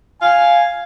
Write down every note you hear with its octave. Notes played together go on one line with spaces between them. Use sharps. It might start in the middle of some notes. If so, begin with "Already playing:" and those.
F5 G#5